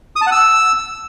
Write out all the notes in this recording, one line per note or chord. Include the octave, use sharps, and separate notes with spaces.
D#6
A5
F#5
E6